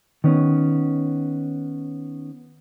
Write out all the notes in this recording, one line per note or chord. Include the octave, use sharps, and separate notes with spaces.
D#3 B3 C#4